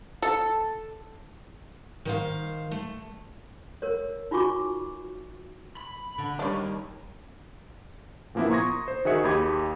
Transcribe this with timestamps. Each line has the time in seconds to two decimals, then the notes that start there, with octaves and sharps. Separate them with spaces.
0.22 A4
2.05 D#3 C5 F5
2.71 A3
3.82 A#4 C#5
4.31 D#4 F4 F#4 G#5 C#6 D6
5.77 B5
6.18 D3
6.39 D#2 D#3 G3 D4 C#5
8.35 A#2 F3 A#3 B3 E4
8.50 A#5 C6 C#6 D#6 G#6 A#6
8.88 C5
9.05 D#3 F#4 G#4 E5 C#7
9.24 D#2 G4 B5 G#6